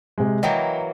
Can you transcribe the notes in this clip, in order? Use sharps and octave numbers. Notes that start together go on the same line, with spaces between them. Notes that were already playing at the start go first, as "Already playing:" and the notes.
C3 G#3
E3 F#3 A#3 D#5 F#5 G5